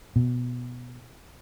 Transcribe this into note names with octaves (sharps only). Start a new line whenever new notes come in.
B2